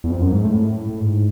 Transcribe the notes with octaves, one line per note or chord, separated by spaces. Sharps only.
E2
F2
F#2
G#2
A2
A2
G#2